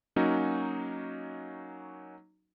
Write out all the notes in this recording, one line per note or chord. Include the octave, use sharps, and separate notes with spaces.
F#3 A#3 C#4 D#4 F#4